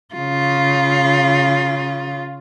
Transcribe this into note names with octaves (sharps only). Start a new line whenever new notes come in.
C#3 F4